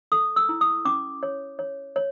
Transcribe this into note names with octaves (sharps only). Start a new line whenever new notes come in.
A4 D#6
E6
E4
D#6
C#4 D6
C#5
C#5
C#5